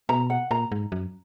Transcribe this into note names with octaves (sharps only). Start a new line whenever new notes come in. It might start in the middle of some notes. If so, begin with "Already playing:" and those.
B2 A#5
F#5
A#2 A#5
G#2
F#2